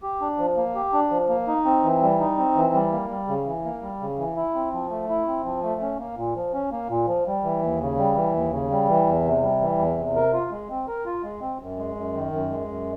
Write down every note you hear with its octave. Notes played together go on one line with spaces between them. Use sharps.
G4
D4
F3
A#3
G4
D4
F3
A#3
D#4
C4
E3
G3
D#4
C4
E3
G3
A#3
G3
C#3
E3
A#3
G3
C#3
E3
E4
C4
F3
A3
E4
C4
F3
A3
C#4
A#3
A#2
F3
C#4
A#3
A#2
F3
G3
E3
D#2
C#3
G3
E3
D#2
C#3
G3
E3
E2
C3
G3
E3
E2
C3
A#4
F4
G#3
C4
A#4
F4
G#3
C4
F#2
G#3
F#2
D#3
F#2
G#3
F#2